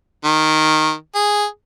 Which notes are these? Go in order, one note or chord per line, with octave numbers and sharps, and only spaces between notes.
D#3
G#4